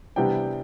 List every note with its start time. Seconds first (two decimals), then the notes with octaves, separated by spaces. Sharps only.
0.16 C3 E3 G3 B3 D4 G5